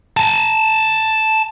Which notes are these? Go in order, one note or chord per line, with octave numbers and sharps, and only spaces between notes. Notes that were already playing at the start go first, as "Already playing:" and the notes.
G#5 A5